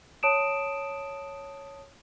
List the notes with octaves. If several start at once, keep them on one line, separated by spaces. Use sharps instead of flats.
C#5 A5 D#6 D7 E7